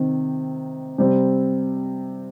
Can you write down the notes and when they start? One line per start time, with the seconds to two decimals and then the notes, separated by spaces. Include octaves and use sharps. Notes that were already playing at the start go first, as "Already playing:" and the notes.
Already playing: C3 D#3 C4
0.98 C3 G3 C4